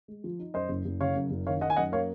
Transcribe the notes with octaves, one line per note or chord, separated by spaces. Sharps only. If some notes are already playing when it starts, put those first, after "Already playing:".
G#3
F3
D#4
F#2 C5 D#5
F#1
F#1
C#3 C#5 F5
F#2
F#1
D#3 C#5 F5
D#4 D#5 F#5
G#5
F#2 D#5 F#5
A#3 C#5 F5